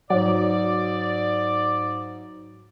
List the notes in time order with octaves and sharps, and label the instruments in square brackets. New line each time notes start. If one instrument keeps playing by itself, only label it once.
[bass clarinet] G#2 [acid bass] F#3 [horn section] D5